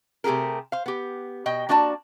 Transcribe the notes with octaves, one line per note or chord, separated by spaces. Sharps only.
C3 A3 G4 G#4 A#4
C5 F5
B3 G4
B2 D#5 G5
A#3 D4 F#4 D5 G#5 A5